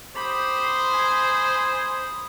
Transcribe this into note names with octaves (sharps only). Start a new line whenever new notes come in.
G4 C5 B5 D#6
G#5